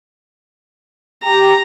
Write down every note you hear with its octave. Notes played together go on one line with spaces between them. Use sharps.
G4 A#5